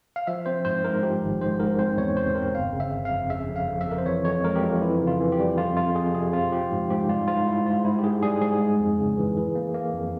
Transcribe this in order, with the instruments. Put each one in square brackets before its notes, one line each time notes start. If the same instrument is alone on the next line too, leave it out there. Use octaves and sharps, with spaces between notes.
[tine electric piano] F5
F3 E5
C4 C5
G#2 C5
G#2 A#4
F3 G4
G#1
G#2 C5
G#2 A#4
C4 C5
E2 C#5
C3 C5
C4 A#4
G1 F5
C#3
E5
G1
F5
F2
C#3 E5
F2
F5
F2
E5
F2 A#4
C5
E3 C#5
F2 C#5
G#3 A#4
G4
F2 F4
E3 E4
C#3
F4
E3
G4
G3
F2 F4
F2 F4
F2 G#4
C3 G#4
C4 F4
F3 G4
G#2
G#2 G4
G3 F4
G#2 F4
G#2 E4
G#2 F4
G#2 E4
G4
G#2 G#4
G3 G#4
G#2 G#4
G#3
F2
C#3
E3
E3
A#3
A#3
F2